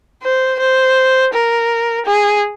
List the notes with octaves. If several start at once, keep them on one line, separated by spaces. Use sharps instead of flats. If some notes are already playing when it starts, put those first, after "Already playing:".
C5
C5
A#4
G#4